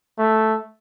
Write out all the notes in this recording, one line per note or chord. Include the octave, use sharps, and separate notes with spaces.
A3